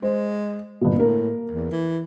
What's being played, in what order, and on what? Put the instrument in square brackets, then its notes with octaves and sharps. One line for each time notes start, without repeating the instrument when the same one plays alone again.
[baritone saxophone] G#3 [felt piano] C5
[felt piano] G1 A#2
[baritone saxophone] A2 [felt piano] A#3 A#4
[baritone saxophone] E2
E3